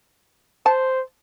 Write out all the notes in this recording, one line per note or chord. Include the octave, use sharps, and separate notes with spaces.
C5 A5